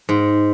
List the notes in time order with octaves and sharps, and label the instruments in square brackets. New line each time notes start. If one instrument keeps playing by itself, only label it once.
[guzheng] G#2